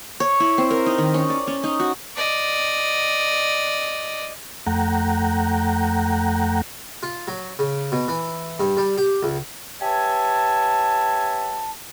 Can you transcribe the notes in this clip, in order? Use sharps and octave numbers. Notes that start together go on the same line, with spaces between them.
C#5
E4
C4
A#4
D#4
D#3
C#4
D5
C#4
D#4
F#4
D5 D#5
F2 A3 F#5 G5 A#5
F4
F#3
C#3
B2
E3
G2
G3
G4
C#2
G4 B4 C#5 E5 G#5 A5